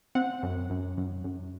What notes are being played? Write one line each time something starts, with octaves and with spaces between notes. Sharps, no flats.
C4 F#5
F#2
F#2
F#2
F#2